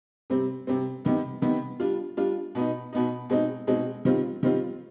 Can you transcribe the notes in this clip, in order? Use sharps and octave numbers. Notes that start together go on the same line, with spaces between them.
C3 G3 C4
C3 G3 C4
C3 D#3 B3
C3 D#3 B3
G3 D4 F4
G3 D4 F4
B2 B3 D#4
B2 B3 D#4
B2 G#3 C4 D#4
B2 G#3 C4 D#4
D#3 G3 C4 F4
D#3 G3 C4 F4